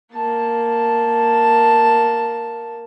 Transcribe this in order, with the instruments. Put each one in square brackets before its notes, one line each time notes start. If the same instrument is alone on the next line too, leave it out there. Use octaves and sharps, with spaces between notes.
[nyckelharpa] A#3 A5